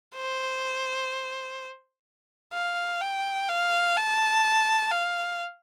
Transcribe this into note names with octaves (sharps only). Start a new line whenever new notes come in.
C5
F5
G5
F5
A5
F5